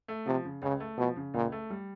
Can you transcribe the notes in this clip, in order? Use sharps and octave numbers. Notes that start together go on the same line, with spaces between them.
A3
C3 F3
C#3
C#2 C#3
A3
B2 F3
C#3
C#2 A#2
A3
G3